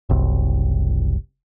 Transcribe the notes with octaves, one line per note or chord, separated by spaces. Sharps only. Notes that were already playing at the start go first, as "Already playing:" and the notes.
F#1 C2